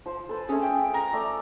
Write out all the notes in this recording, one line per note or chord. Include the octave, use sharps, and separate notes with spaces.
F3 C5
A4 B4 C5
A3 C#4 G#4
G5
A#5
A3 D5 C#6